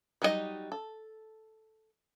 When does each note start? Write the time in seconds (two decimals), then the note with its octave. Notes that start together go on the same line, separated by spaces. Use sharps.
0.22 F#3 G3 D#4 F#4 D#5
0.72 A4